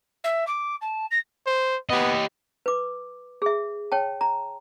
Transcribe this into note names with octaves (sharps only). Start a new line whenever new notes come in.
E5
D6
A5
A#6
C5
B3 G4 D#5
B4 D6
G#4 E5
C#5 G5 A5
A#5